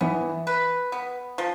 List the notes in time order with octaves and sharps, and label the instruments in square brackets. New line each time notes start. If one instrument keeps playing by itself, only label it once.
[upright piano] E3 [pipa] B3
[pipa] B4
B3
F3